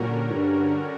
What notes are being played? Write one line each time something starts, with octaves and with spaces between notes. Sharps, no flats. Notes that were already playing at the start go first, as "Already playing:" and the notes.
Already playing: A#2 D3 G3 C#4 F#4 A#4
G2